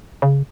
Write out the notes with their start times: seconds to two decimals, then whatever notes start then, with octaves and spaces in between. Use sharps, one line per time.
0.22 C#3